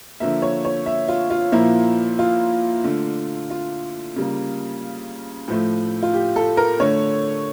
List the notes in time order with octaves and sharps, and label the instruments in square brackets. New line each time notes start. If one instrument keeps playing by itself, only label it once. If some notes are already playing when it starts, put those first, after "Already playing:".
[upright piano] D3 F3 A#3 E5
C#5
C#5
E5
F4
F4
A#2 F3 A#3 E4
F4
D3 A3
F4
C#3 G3 A#3
A2 F3 A3
F4
G4
A4
A#4
D3 A3 C#5